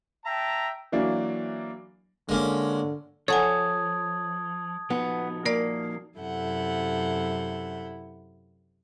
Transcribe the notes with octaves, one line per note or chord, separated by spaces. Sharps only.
E5 G5 A5 A#5
E3 F#3 A#3 D4
D3 G#3 A#3 C#4
F3 A4 C#5 F#5 G#5 A5 D#6 G#6
F3 B3 D#4 F#4
A#3 A#4 D5 C7
F#2 C3 E4 A4 F#5 G6